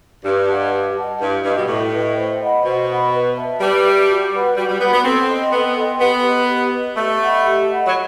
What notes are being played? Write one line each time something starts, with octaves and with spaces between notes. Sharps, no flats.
G2 G4
D#5 F#5 A5
G4
D#5 F#5 A5
G2 E4
G2 B4 D#5 G5
B2
A2 E4
B4 D#5 G5
C5
D#5 F#5 B5
B2 C5
D#5 F#5 B5
B4
E5 A5
G3 B4
E5 A5
F#4
B4 F#5 B5
G3 F#4
G3
B3 B4 F#5 B5
B3
C4 A4
D#5 G5 C6
B3 A4
D#5 G5 C6
B3 G4
B4 D#5
G4
B4 D#5
A3 G4
D#5 F#5 B5
G4
D#5 F#5 B5
F#3